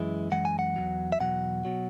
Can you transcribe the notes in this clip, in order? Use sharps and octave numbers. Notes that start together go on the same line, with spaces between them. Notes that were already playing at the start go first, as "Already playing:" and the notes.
Already playing: F#2 E3 G#3 E5
F#2 E3 G#3 F#5
G#5
F#5
E2 B2 F#3
E5
E2 B2 F#3 F#5
B2 F#3